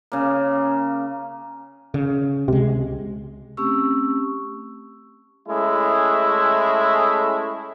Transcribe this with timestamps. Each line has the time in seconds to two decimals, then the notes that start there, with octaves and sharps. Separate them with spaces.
0.12 C#3 A#3
1.94 C#3
2.48 C#2 C3 G#3
3.57 A3 C4 C#4 G4 C#6 E6
5.49 G#3 A3 C#4 E4